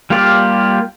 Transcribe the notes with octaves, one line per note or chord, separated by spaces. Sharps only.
G3 A#3 F4 G4 D5